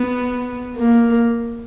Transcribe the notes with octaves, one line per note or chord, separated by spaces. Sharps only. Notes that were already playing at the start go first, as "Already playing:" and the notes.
Already playing: B3
A#3